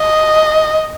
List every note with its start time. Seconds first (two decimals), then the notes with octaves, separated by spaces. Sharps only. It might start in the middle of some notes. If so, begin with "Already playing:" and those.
Already playing: D#5